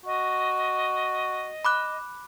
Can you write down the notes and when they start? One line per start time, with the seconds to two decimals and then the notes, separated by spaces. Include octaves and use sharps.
0.06 F#4 D#5
1.65 B5 D6 F#6